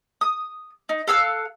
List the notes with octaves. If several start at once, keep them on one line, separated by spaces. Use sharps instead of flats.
D#6
D#4
A4 F5 E6 F#6